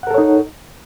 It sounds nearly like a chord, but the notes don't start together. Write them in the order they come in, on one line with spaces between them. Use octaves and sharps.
F#5 A#4 A4 C#5 D#4